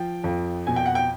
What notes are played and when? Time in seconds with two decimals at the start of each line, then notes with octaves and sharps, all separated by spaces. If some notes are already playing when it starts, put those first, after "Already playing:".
Already playing: F3 G5
0.24 F2
0.67 B2 G#5
0.76 G5
0.86 F#5
0.95 G5